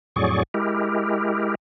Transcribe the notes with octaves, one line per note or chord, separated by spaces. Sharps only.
F2 A2 F#3 G#4 D5 C#6
G#3 E4 G4 A#4